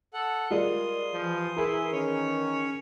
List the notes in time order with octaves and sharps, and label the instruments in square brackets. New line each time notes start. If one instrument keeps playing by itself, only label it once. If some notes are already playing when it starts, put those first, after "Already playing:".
[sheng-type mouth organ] A4 F#5
[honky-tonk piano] G3 G#3 F4 [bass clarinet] A#4 [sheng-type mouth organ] C6 D#6
[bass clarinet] E3 [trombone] F3
[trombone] E4 [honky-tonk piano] G#4 A#4
[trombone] D#3 [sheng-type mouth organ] C#4 C#5